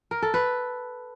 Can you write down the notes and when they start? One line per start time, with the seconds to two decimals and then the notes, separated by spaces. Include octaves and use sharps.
0.11 A#4
0.22 A4
0.34 B4